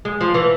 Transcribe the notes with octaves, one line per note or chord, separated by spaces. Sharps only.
G#3
F3
E3